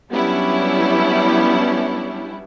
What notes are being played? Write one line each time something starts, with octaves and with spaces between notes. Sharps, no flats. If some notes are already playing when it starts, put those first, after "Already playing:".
F#3 G3 B3 C#4 D4 E4